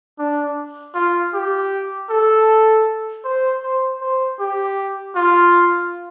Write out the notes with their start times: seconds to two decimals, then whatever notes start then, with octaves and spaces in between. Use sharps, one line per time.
0.19 D4
0.95 F4
1.33 G4
2.10 A4
3.24 C5
3.62 C5
4.01 C5
4.39 G4
5.15 F4